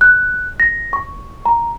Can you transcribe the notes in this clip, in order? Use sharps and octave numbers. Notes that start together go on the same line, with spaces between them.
F#6
A#6
C#6
A#5